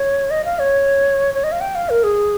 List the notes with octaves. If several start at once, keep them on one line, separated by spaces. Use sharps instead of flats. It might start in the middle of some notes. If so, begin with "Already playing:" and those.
Already playing: C#5
D#5
F5
C#5
C#5
D#5
F5
G5
F5
A#4
G#4